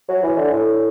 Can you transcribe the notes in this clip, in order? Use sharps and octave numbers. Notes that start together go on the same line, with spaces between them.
F#3
E3
D3
A2